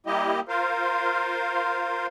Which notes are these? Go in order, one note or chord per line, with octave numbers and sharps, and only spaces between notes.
G3 A#3 E4 G4 D#5
F4 A#4 C5 F5